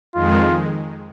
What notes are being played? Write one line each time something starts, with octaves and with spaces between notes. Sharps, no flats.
F2 D#3 G#3 F4